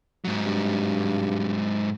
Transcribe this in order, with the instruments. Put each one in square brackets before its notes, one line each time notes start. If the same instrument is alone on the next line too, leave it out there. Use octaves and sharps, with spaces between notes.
[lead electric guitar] G#2 F#3
[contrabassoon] G2